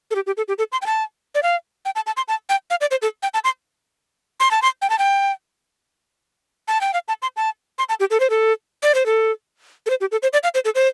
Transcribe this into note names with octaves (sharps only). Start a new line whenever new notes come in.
A4
G4
G4
A4
G4
A4
C6
G5
A5
D5
F5
G5
A5
A5
C6
A5
G5
F5
D5
C5
A4
G5
A5
C6
C6
A5
C6
G5
A5
G5
A5
G5
F5
A5
C6
A5
C6
A5
G4
A4
C5
A4
D5
C5
A4
A4
C5
G4
A4
C5
D5
F5
C5
A4
C5